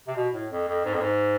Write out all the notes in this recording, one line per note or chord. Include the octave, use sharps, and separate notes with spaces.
C3
B2
A2
F2
F2
G#2
F2
G#2